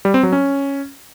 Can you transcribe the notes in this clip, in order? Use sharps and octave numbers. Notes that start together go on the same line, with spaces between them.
G3
C4
F#3
C#4